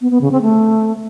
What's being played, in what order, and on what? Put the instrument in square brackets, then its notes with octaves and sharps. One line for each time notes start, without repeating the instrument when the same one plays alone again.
[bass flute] B3
B3
C#3
C4
A3